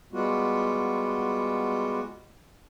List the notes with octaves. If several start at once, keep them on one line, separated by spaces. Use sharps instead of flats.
G3 G#3 B3 F4 F#4